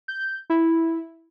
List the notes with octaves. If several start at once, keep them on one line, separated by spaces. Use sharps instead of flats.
G6
E4